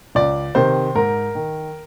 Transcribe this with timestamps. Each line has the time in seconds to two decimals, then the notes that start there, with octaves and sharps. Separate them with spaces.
0.15 C#2 D5
0.55 C3 D#3 C5
0.95 G#2 A#4
1.35 D#3